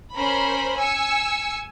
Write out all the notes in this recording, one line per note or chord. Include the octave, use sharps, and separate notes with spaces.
C#4 A#4 C5 B5
G#5 E6 C#7